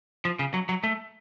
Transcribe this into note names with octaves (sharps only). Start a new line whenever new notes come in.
F3
C#3
F#3
F#3
A3